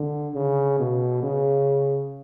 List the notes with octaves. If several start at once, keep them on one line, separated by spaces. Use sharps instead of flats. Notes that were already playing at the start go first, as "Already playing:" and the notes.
Already playing: D3
C#3
B2
C#3